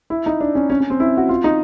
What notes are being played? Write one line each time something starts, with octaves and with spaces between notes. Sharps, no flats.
E4
D#4
D4
C#4
C#4
C#4
C4
E4
F#4
F4
D#4